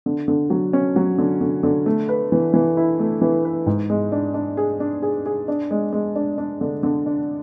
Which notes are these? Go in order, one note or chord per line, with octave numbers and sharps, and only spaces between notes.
D3
D3
F#3
C#4
F#3
D3
D3
D3
A3
B4
E3
E3
E4
A3
E3
B4
G#2
G#3
D4
D4
G#4
D4
G#4
G#4
D4
G#3
G#3
D4
D4
D3
D3
D4